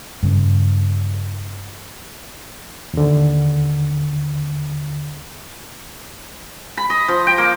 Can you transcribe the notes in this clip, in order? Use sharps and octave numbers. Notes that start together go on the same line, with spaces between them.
G2 C#3
D#2 D3
B5
D#5
F3
G5
A#3